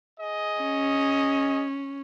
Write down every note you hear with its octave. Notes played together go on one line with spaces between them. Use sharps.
G#4 D#5
C#4